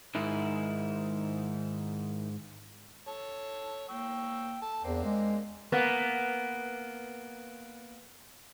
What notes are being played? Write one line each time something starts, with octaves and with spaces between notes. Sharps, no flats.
G#2 D#3 E4
A4 C#5 A5
A#3 G5 C#6 E6
A4 A5
E2 A#3 C4 D4
G#3
A#3 B3